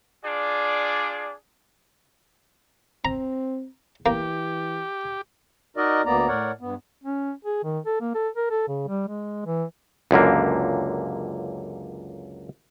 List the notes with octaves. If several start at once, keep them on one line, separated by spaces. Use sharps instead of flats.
D4 F4 G#4 D5
C4 A#5
E3 A#3 G4
D#4 F#4 A#4 D5 D#5
D2 A#3 B3 D5 A#5
A2 A#4 C#5 D5 F#5
G2 B3
C#4
G#4
D#3
A4
A#3
A4
A#4
A4
C#3
G3
G#3
E3
C#2 F#2 D3 A#3